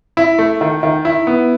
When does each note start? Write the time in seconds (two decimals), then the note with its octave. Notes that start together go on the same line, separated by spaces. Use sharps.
0.17 E4
0.39 A3
0.61 D#3
0.83 D#3
1.05 E4
1.27 B3